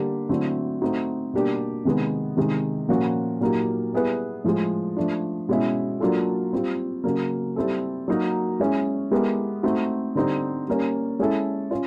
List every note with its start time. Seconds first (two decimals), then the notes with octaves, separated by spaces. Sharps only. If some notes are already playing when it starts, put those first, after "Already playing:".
Already playing: D3 G3 A#3 D4 G4
0.29 D3 F#3 A3 C4 E4
0.81 A3 C4 D#4 F#4
1.33 B2 G3 A#3 D4 G4
1.85 C3 D#3 G#3 B3
2.37 C3 D#3 G#3
2.89 A#2 F3 A#3 C#4 F#4
3.40 A#2 F#3 A#3 D#4 G4
3.92 G3 B3 E4 G#4 B4
4.44 A2 F3 G#3
4.97 F3 A3 D4
5.49 B2 G#3 C#4 E4
6.00 F#3 A#3 D4 F4 A4
6.53 G3 C4 F4
7.04 C#3 F#3 A#3
7.56 G3 C4 E4 A4
8.08 F#3 A#3 D#4 F#4 A#4
8.60 G#3 C#4 E4 G#4
9.11 G#3 B3 E4 G4 A#4
9.63 A3 C4 D#4 F#4
10.15 D3 G3 C4 D#4
10.67 G3 A#3 C#4
11.19 G#3 C#4 E4 A4
11.71 C#4 F4